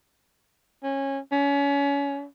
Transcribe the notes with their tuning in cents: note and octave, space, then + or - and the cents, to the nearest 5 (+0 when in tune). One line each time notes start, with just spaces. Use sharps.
C#4 -20
C#4 +30